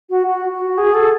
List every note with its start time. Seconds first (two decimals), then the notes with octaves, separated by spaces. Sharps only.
0.09 F#4
0.26 F#4
0.51 F#4
0.77 G#4
0.94 A4